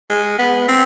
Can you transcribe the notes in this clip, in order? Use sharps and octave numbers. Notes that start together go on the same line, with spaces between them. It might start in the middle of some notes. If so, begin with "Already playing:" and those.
G#3
B3
C4